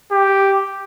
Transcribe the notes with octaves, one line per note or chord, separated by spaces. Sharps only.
G4